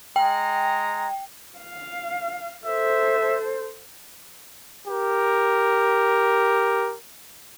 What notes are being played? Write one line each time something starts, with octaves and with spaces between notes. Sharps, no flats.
G#3 G5 A#5
F5
A4 C5 E5
G4 A#4